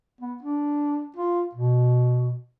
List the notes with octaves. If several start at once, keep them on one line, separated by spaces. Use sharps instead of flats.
B3
D4
F4
B2